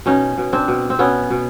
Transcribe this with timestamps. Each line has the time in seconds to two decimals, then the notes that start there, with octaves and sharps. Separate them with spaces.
0.06 B2 C#4 D#4
0.38 B2
0.53 C4 D4
0.68 B2
0.90 C4
0.99 B2 B3 C#4
1.30 B2